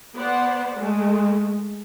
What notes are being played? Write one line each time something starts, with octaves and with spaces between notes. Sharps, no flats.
B3 C5 D5 F#5
G#3 A3